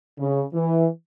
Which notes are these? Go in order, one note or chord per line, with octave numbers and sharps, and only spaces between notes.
C#3
E3